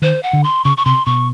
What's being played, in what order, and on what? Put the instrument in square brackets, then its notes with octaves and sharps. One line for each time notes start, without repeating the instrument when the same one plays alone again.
[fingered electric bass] D#3 [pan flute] C5
[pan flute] F#5
[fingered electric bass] D3
[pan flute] C6
[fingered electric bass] C#3 [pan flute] C#6
[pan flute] C#6
[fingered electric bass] C3 [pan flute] C6
[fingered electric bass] B2 [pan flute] C#6